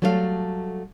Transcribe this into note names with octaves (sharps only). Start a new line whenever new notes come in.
F#3 G3 A3 A4 C5 F5